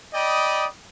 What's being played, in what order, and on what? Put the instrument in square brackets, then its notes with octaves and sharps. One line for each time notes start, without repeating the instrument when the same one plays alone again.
[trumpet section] D5 D#5 G5 B5 D#6